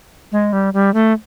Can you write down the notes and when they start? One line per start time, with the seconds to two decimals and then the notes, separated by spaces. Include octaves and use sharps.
0.32 G#3
0.53 G3
0.74 G3
0.94 A3